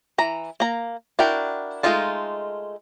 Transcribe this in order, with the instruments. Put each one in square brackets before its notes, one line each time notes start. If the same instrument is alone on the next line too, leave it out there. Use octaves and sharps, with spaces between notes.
[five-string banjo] E3 A#5
A#3 A#5
D4 E4 F#4 A#4 G5
G#3 A3 D#4 F4 A4